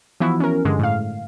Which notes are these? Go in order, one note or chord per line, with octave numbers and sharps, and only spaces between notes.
E3 F3 B3 E4 F#4
C#4 A#4
G2 D3 G#3
A2 F5